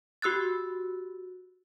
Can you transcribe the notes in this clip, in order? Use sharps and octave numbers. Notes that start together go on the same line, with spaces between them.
F#4 G4 E6 F#6 A6